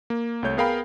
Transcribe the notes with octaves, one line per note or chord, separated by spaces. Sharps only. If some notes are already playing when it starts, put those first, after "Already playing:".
A#3
C2 A3 C#5 G6
B3 G#4 A#4 F5 G5 B5